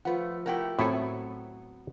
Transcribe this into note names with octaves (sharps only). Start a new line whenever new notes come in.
F3 A3 B4 F#5
A3 E4 G4 A#4 F#5 G5
A2 F#3 B3 C4 E4 A4 G#5